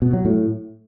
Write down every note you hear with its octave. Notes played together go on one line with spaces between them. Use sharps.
B2
F#3
A2